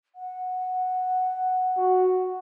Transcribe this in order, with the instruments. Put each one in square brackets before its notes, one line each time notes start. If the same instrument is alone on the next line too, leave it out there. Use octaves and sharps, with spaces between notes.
[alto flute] F#5
[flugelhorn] F#4